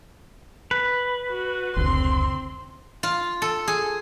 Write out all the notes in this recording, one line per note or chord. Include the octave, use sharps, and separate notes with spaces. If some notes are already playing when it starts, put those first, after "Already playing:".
B4
F#4
F1 C#2 D3 C4 C6
F4
A4
G#4